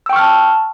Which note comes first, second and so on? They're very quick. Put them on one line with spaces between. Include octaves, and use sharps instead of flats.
E6 G5 C#6 F6 A5